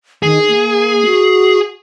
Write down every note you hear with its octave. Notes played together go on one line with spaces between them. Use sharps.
D#3 G#4
A#3
F#4